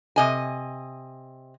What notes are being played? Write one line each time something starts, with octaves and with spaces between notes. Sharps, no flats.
C3 D#5 G#5